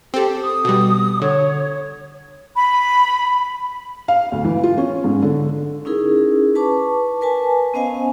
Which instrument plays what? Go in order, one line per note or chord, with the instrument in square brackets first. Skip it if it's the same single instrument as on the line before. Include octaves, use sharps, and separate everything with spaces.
[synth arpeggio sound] C4 A4 [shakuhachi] G4
[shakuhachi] D#6
[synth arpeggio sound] B2 G3
[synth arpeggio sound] D3 [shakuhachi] C#5
[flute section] B5
[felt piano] F5
D2
E3
F4
C#4
G#2
D3
[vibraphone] C#4 D#4 E4 G#4 A#4
B4 A5 C#6 D6
A#4 B4 G#5 A5
B3 C#4 C5 D#5 F5 G#5